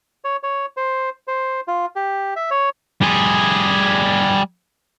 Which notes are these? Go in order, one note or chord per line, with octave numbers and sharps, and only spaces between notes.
C#5
C#5
C5
C5
F4
G4
E5
C#5
G3 G#4